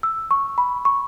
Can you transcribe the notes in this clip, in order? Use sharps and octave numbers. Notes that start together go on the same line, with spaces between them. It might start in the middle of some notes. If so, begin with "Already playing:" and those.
E6
C#6
B5
C#6